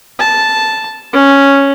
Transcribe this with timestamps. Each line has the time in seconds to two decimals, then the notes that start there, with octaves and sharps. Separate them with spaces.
0.20 A5
1.13 C#4